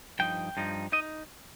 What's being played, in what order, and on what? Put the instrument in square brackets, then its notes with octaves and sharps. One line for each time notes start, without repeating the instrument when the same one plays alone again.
[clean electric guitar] G2 F3 D#4 G5
G2 F3 D#4
D#4 D#5